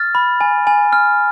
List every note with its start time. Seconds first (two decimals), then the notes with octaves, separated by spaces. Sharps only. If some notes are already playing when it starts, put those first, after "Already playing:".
Already playing: F6 A6
0.15 B5
0.41 G#5
0.67 G#5
0.93 F6